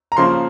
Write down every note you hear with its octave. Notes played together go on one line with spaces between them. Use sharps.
A#5
C#3 F3 A#3 C6